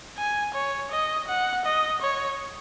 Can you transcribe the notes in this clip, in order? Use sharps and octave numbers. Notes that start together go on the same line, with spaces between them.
G#5
C#5
D#5
F#5
D#5
C#5